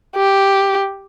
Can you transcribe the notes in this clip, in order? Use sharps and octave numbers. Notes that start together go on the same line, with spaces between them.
G4